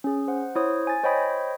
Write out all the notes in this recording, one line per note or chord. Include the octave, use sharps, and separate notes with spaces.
C#4 G#4
C5 F#5
E4 C5 C#5 D#6
G#5 A6
C5 C#5 D#5 G5 B5 D#6